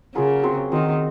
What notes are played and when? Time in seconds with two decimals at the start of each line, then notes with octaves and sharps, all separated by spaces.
0.15 C#3 F#3 A#3 F4 G#4
0.43 F#3 C4 F#4 C5
0.72 D#3 F#3 C4 F#4 C5